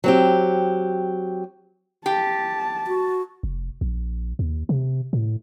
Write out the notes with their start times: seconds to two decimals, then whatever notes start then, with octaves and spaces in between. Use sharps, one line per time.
0.04 F#3 C4 G4
2.06 G4 A5
2.87 F#4
3.43 F1
3.81 A#1
4.39 D#2
4.69 C3
5.13 A2